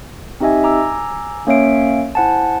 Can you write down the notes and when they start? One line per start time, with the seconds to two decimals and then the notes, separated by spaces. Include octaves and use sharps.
0.40 C4 D#4 G4 D#5 E5 G#5
0.63 G#5 A#5 D6 E6
1.47 A#3 C#4 C#5 E5 F5 D7
2.15 E4 C5 F#5 G#5 A5